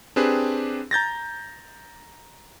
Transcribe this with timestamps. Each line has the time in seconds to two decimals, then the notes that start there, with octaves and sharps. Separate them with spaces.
0.16 C4 D4 G4 G#4 B4
0.91 A#5 G6 A6 A#6